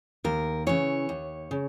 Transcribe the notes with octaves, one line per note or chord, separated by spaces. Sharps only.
D#2 A#4
C#3 E3 C#5
D#2
C#3